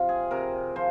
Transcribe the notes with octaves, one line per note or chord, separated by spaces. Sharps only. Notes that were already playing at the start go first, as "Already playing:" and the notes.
Already playing: C3 F3 F4
G#4
C3 A#4
F3 C5